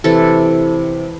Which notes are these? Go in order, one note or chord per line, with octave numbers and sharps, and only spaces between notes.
C3 E3 A3 A4